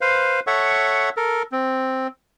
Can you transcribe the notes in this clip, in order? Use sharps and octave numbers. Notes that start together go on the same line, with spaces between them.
B4 C5 F5
A4 C#5 E5 F#5 C#6
A4 A#4
C4